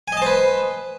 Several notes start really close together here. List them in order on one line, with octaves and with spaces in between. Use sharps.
G#5 D#5 A5 C5 B4